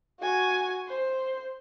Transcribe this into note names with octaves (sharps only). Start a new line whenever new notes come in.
F#4 G#5
C5